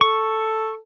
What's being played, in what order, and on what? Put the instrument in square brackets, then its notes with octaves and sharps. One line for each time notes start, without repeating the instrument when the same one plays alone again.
[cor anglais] A4 [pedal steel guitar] C#6